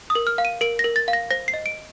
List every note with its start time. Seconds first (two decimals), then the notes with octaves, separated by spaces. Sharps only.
0.10 D#6
0.15 A#4
0.27 F6
0.38 F5
0.45 D#7
0.61 A#4 D7
0.79 A#6
0.84 A#4
0.96 A6
1.08 F5
1.13 A#6
1.31 C5 A#6
1.48 C7
1.54 D#5
1.66 D7